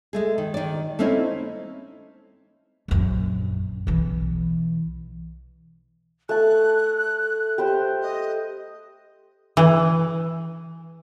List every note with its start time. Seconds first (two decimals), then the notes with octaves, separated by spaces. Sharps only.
0.13 G#3 A3 G#4
0.38 D#3
0.54 D#3 D5
0.99 A3 A#3 C4 C#4 D#4 E4
2.88 A#1 F#2
3.87 B1 E3
6.29 A3 A5 F#6
7.58 G4 C5 C6
8.02 D#5
9.57 E3